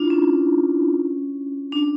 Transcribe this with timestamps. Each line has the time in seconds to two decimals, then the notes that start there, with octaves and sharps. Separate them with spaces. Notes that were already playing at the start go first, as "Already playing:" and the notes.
Already playing: D4 E4 F4
0.10 C#4
1.72 D4